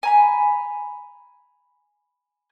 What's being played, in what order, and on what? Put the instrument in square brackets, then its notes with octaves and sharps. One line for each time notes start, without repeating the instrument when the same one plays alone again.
[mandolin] G#5 A#5 B5